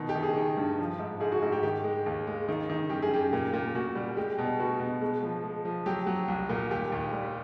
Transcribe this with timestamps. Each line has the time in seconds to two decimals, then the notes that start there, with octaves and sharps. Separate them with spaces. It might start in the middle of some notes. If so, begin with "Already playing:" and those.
Already playing: B2 D#3
0.09 G4
0.15 D#3
0.23 G#4
0.36 D#3
0.57 G2
0.79 F3
0.99 G#2
1.20 G#2 G#4
1.32 F#4
1.42 G#2 F#4
1.52 G4
1.63 D#3 G4
1.84 G#3
2.06 D#2
2.27 G#3
2.48 D#3
2.70 D#3
2.90 F#2 G4
3.02 G#4
3.11 F#2 G4
3.33 A#2
3.53 A#2
3.75 A#2 F#4
3.95 G3
4.17 G#3 G4
4.38 B2
4.59 B3 F#4
4.80 B2
5.01 G#3
5.23 F3
5.44 G#3
5.65 F3
5.86 F#3 G4
6.07 F#3
6.28 C2
6.49 A#2
6.71 D#2 G4
6.92 D#2
7.12 G3